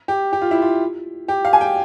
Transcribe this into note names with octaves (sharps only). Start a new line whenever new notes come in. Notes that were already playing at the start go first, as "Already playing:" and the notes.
G4
G4
F4
E4
F4
G4
F5
G#5
G5